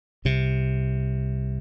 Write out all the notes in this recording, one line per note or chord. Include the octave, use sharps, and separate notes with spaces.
C2 C3